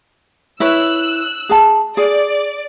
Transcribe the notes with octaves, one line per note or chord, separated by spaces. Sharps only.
E4 B4 C#5 E6 F#6
G#4 A5
G#4 D5